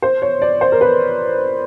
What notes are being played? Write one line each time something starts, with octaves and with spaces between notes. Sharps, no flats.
C5
C#5
D5
C5
A#4
B4